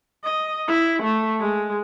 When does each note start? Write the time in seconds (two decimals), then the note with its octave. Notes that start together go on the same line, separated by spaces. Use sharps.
0.24 D#5
0.68 E4
1.03 A3
1.40 G#3